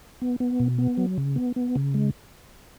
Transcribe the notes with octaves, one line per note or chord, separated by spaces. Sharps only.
B3
B3
B2
B3
F#3
C#3
B3
B3
C#3
G#3